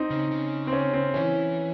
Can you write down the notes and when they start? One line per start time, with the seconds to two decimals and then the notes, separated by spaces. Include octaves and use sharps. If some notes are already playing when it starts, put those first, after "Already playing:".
Already playing: C4 D#4
0.10 C#3
0.31 C#3
0.67 C4
0.73 C#4
0.93 C4
1.14 E3 C#4